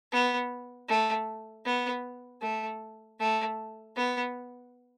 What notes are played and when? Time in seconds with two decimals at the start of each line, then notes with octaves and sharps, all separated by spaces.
0.12 B3
0.89 A3
1.65 B3
2.42 A3
3.20 A3
3.96 B3